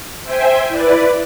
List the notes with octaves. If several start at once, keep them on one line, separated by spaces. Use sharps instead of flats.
C5 E5 G5 G#5
E4 B4 D5